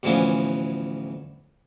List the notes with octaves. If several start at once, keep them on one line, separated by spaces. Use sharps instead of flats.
D2 A2 E3 F3 B3 C#4